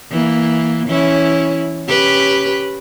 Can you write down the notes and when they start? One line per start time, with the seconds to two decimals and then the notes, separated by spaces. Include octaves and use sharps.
0.11 E3 A#3
0.87 E3 C#4 E4
1.86 C#4 G4 B4